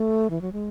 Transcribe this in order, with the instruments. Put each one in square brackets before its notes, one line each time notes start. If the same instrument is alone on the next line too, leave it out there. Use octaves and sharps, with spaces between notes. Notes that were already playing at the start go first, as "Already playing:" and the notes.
Already playing: [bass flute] A3
E3
F#3
G#3